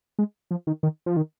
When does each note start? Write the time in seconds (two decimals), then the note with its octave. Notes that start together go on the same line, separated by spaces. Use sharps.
0.19 G#3
0.51 F3
0.67 D#3
0.83 D#3
1.06 F3
1.17 D#3